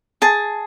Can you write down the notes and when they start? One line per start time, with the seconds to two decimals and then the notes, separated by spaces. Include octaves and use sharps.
0.22 G#4 A5